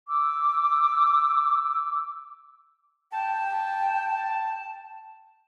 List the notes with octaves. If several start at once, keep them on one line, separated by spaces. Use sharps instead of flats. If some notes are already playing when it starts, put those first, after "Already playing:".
D6 E6
G5 A5